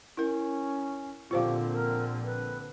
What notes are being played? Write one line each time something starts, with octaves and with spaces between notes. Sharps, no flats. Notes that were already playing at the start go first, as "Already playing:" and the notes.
C#4 E4 A#4
A#1 D3 C4 F4 G4 C5 F5
A#4
B4